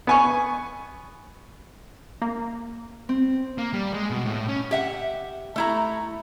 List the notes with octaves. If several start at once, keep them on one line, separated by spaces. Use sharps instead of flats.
B3 G#5 C#6
A#3
C4
A#3
G3
G#3
B2
A2
C#4
G4 E5 F#5
A3 E4 A#5